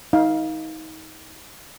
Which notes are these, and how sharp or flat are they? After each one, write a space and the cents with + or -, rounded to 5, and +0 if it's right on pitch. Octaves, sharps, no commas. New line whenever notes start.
D#4 +30 F5 +5